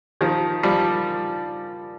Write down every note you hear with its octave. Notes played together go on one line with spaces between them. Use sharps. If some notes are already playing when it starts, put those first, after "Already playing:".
D#3 F3
F3 G3